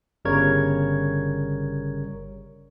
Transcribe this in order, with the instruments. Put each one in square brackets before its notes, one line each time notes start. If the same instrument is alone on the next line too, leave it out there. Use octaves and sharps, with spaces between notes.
[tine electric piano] G1 C#3 G3 A#4 C#5 G#6